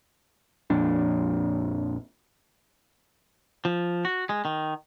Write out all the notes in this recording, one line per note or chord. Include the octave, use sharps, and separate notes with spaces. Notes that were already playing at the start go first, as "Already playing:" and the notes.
A#1 F2 A#2 D4
F3
F#4
G#3
D#3